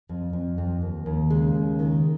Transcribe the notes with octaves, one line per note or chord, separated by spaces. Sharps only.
F2
F2
F2
D#2
D#2
C#3 G#3
D#2
D#3